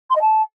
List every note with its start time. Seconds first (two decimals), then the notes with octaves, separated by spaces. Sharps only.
0.10 C6
0.15 D#5
0.21 A5